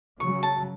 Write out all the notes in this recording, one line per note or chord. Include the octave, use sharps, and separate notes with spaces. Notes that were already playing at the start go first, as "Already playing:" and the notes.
C#3 F#3 C#6
A5